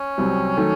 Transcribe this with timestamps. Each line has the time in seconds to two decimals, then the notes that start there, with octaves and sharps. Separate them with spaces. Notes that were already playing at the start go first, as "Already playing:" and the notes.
Already playing: C#4
0.18 C2 C3 F#3 C4
0.57 D#3 F#3 A3